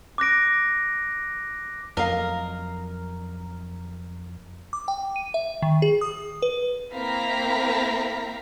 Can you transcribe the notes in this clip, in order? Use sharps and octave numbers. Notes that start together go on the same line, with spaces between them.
D6 F#6 A#6 D7
F2 F#3 A#4 D#5 F5
D6
G5
D#7
E5
D#3
G#4
D#6
B4
A#3 C4 E4 F5 A#5 B6